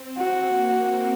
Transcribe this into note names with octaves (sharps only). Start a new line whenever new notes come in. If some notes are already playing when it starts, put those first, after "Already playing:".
Already playing: C4
F#4
A#3
C4